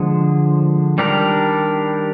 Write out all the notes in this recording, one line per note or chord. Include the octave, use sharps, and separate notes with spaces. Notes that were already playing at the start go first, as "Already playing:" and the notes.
Already playing: D3 F3 G#3
D#3 G3 D4 G4 A#4